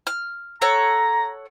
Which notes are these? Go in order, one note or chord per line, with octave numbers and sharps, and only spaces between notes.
F6
A4 C#5 F#5 A#5